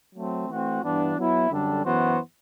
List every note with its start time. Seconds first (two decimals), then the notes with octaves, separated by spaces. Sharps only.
0.14 F#3 A3 C4
0.49 E3 A3 C4 F#4
0.82 G2 E3 B3 D4
1.16 F#3 B3 E4
1.50 F#2 D3 G3 D4 A4
1.84 F#2 E3 B3 F#4 C5